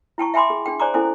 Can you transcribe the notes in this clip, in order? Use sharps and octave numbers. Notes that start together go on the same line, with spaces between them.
E4 G5 A5 C#6
E5 G5 G#5 B5 C6 D6
G#4
D4 G#4 G5
C5 D5 G#5 A#5 D6
C#4 E4 A4 C5 G#5